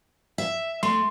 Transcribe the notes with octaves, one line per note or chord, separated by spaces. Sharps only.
E5
A3 C6